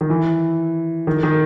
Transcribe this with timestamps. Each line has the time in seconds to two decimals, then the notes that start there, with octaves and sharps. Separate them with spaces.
0.01 D#3
0.10 E3
1.07 D#3
1.23 D#3